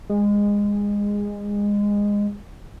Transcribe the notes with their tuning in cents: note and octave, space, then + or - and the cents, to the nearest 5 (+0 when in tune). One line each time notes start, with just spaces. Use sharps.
G#3 -20